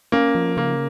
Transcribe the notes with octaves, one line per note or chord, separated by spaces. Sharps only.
A#3 C#4
F3
C#3 A#3